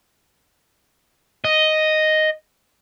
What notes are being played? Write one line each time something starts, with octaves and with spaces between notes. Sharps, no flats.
D#5